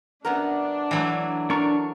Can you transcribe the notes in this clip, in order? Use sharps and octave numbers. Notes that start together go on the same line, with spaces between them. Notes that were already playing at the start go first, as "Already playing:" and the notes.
F#2 B3 D4 A#4
E3 F#3 A3
D4 A#4 C#6